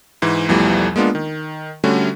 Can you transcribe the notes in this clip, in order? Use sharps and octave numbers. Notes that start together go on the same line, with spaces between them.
G#2 E3
B1 E2 E3 F3 G3 A3
G#3 A#3 B3 D4 F4
D#3
D3 G3 A3 C#4 F#4